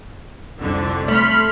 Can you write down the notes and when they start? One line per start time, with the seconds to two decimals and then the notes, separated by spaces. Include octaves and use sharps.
0.58 C2 F2 D3
1.08 A3 B5 C6 F6